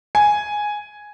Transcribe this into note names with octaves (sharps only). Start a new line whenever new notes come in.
G#5